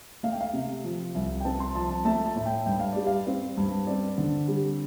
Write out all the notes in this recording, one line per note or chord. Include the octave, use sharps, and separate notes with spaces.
A3 F5
G5
F5
C3
F3
C2
G5
C4 A5
C6
F3 A5
A5
A3 A5
A5
A2
G5
G2 G5
F5
G3 D5
F5
C4
G2
C4 D5
D3
G3